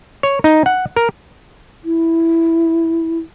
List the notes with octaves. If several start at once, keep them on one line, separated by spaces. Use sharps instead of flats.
C#5
D#4
F#5
A#4
E4